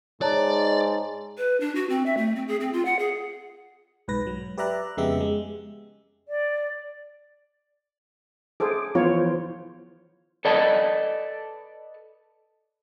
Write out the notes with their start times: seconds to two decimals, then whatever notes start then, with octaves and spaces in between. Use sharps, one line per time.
0.22 G#2 C#5 D5 A5 A#5
1.38 B4
1.60 D4
1.75 F#4
1.89 C4
2.06 E5
2.17 A3
2.36 C4
2.48 G#4
2.60 C4
2.73 F4
2.85 F#5
2.99 G#4
4.08 B1 G#2 B4 A#6
4.27 F#3
4.58 G4 B4 D5 E5 A#5 F#6
4.97 F2 C#3 G#3 B3 G4 E5
5.20 G#3
6.28 D5
8.60 G#4 A4 C5 D6
8.95 E3 F3 B3 F4 C5 C#5
10.45 A4 B4 D5 D#5 A5